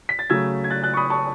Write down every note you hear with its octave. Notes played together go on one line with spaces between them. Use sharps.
B6
A6
C#3 F#3 A3 E6 G#6
G#6
F#6 A6
F#6 A6
C#6
B5 D#6
A5 C#6